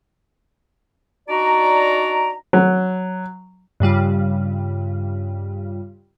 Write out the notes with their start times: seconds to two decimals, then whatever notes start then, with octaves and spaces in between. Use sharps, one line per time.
1.29 D4 D#4 F#4 D5 A#5
2.53 F#3
3.80 G2 C#3 G3 F4